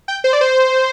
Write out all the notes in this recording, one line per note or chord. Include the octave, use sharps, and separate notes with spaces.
G5
C5
D5
C5